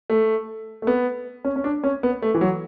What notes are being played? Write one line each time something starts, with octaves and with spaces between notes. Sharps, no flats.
A3
A3
B3
C#4
C#4
D4
C#4
B3
A3
E3
F#3